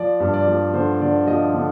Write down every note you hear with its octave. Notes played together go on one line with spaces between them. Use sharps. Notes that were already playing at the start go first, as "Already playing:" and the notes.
Already playing: F3 D5
G2
D5
F3
D3 C5
D3 D5
F3 D#5
D3